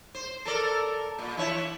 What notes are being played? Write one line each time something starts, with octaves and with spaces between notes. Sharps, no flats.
C5
A4 A#4 D5
A#2
E3 E4 C#5